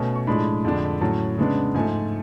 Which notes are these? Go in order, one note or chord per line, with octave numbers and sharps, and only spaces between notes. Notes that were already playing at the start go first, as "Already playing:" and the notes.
Already playing: B2 A3 C#4 G#5
C#6
A2 F3 G#3 D4 B5
F2 D3 G#3 D4
A2 F#3 C#4 A5
C#3 G#3 B3 D4
G#2 F3 A3 G#5